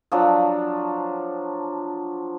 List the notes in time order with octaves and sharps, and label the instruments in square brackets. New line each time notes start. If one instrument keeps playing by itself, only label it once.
[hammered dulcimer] F3 F#3 D4